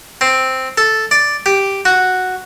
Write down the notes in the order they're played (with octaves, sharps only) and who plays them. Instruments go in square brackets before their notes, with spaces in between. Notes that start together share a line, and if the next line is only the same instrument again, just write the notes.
[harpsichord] C4
A4
D5
G4
F#4